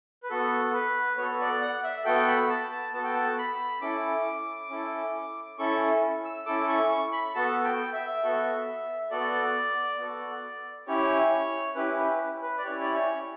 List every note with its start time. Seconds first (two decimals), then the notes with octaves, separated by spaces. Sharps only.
0.23 B4
0.30 B3 F#4 A4
0.73 B4
1.17 B3 F#4 A4 C#5
1.40 D5
1.61 F#5
1.83 E5
2.05 B3 F#4 A4 G5
2.28 B5
2.49 A5
2.71 A5
2.93 B3 F#4 A4 A5
3.04 G5
3.14 A5
3.38 B5
3.81 C#4 E4 A4 D6
4.70 C#4 E4 A4
5.58 C#4 E4 A4 C#6
6.25 E6
6.46 C#4 E4 A4 D6
6.69 C#6
6.91 C#6
7.13 B5
7.35 B3 F#4 A4 A5
7.64 G5
7.93 E5
8.23 B3 F#4 A4
9.11 B3 F#4 A4 D5
9.99 B3 F#4 A4
10.87 C#4 E4 G4 C#5
11.75 C#4 E4 G4 B4
11.98 B4
12.42 B4
12.58 D5
12.64 C#4 E4 G4 C#5
12.81 D5
12.93 C#5